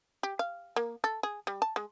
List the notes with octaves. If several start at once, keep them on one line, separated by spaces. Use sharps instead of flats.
G4
F5
A#3
A4
G#4
G3
A5
G#3